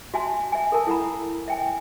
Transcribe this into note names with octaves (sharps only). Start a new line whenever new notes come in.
F#4 E5 G#5 A5 C6
E5 G#5
A4 A#4 A5
E4 A4 F#5 A#5 B5
E5 G5 G#5